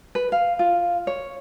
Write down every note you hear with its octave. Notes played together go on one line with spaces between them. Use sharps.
B4
F5
F4
C#5